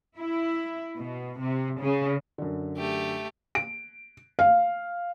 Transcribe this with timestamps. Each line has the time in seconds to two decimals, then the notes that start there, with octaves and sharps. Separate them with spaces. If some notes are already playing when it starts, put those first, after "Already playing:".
0.18 E4
0.98 B2
1.41 C3
1.81 C#3
2.38 F#2 D3
2.77 A3 G4
3.55 D7
4.39 F5